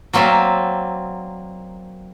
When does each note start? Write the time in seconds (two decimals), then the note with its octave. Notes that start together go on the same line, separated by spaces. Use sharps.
0.13 F#3 A#3 C4 D5 E5